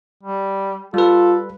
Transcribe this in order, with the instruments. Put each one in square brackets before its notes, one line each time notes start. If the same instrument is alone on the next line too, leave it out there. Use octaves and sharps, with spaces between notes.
[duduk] G3
[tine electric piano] G3 B4 [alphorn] F4 [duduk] A4